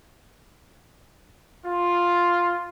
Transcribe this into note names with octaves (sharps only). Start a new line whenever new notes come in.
F4